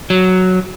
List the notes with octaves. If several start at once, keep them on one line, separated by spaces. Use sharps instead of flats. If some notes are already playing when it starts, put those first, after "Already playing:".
F#3